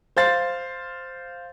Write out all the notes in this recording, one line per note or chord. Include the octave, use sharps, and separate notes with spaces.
C5 F5 A6